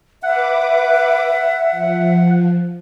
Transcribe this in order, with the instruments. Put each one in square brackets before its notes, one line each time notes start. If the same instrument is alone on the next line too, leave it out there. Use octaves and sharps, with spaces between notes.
[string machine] B4 D6 [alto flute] E5 [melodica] F#5
[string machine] F3